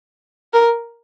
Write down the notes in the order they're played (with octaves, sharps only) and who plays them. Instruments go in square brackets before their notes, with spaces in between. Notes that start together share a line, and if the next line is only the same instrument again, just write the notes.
[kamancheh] A#4